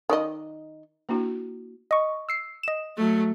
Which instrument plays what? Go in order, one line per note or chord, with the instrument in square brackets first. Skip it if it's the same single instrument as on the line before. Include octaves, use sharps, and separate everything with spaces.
[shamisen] D#3 D5 D#5
[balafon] A#3 D4 E4 F#4
[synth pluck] D#5 C#6
E6 C7 C#7
D#5 E7
[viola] F#3 A3